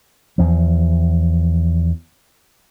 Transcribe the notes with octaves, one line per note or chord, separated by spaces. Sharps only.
E2 F3